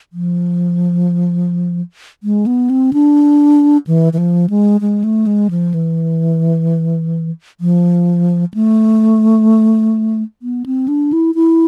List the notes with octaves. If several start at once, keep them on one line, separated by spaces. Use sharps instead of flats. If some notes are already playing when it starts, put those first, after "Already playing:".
F3
G#3
B3
C4
D4
E3
E3
F3
G#3
G#3
A3
G#3
F3
E3
F3
A3
B3
C4
D4
E4
E4